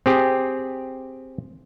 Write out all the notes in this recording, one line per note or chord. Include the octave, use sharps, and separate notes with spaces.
C4 G4 G#4